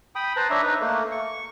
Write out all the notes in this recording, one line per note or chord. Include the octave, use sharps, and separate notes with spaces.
G5 B5 D#6
B4 C5 A5 A#5
D4 C#5 E5 A#5
D#4 B4
A3 A#3
C#6